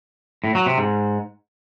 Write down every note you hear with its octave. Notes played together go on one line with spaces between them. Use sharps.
A2
F#3
C3
G#2